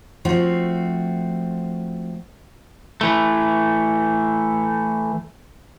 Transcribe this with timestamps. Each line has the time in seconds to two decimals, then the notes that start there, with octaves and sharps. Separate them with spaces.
0.25 F3 A3 C4 F#4
3.01 E3 A3